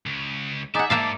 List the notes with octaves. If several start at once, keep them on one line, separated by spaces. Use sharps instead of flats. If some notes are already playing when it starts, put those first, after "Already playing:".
C#2
D#4 G#4 D5 E5 F#5
E2 G#2 A#3 E5 F5 A5 D6